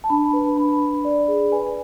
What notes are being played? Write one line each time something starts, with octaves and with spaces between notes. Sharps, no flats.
A5
D4 B5
B4
D4 B5
D4
D5
G#4
B4 G#5